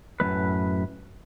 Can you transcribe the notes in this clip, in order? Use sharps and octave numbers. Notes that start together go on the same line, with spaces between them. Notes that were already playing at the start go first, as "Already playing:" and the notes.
F#2 A2 G#3 B4